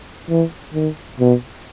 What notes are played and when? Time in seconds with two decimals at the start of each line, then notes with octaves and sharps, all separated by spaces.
0.29 E3
0.74 D#3
1.20 B2